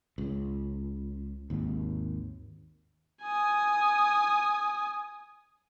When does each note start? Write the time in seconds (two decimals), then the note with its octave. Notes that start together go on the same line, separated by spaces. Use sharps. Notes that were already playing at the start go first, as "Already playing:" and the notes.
0.18 C#2
1.50 G#1 D#2
3.22 G#5 D#6